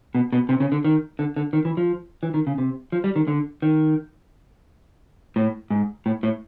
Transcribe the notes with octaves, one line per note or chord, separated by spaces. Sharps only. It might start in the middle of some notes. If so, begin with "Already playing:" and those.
B2
B2
C3
C#3
D3
D#3
D3
D3
D#3
E3
F3
E3
D#3
C#3
C3
F3
G3
D#3
D3
D#3
A2
G#2
A2
A2